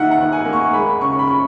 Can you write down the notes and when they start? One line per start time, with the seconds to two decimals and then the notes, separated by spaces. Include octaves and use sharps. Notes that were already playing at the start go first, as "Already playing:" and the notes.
Already playing: D#3 A#3 E5 F#5
0.11 F#5
0.17 D#2
0.32 G#5
0.45 A#3
0.53 C#6
0.73 G#3 B5
1.01 C#3 C#6
1.19 B5
1.28 C#6